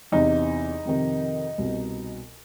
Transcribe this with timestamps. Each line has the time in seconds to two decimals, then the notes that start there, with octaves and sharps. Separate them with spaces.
0.12 E2 C3 E3 D#4
0.85 F2 C3 D#3
1.58 C2 B2